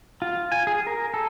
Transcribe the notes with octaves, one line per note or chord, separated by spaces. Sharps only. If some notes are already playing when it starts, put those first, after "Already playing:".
F4
G#5
G#4
A#4
A4